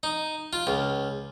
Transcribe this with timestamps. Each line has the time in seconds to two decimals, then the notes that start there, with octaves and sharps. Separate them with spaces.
0.03 D#4
0.53 F4
0.67 C#2